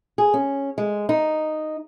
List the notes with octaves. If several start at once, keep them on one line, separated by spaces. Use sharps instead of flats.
G#4
C#4
G#3
D#4